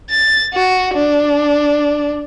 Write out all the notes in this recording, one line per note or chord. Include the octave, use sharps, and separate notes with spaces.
A6
F#4
D4